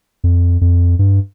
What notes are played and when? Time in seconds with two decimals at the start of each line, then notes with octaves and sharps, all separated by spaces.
0.24 F2
0.61 F2
0.99 G2